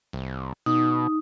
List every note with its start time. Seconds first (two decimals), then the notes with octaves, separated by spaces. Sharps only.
0.13 C2
0.66 B2 D#4